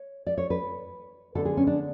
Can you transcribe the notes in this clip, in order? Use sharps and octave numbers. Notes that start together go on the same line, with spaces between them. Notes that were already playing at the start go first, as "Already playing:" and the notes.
Already playing: C#5
D5
C#5
B4
D3 G#3 B3 A4
G#4
C#4
D4